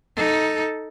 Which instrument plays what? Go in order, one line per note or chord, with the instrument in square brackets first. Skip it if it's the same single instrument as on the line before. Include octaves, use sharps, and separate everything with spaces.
[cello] D#4 A4